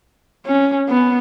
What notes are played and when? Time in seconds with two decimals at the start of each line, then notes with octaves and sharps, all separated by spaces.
0.46 C#4
0.89 B3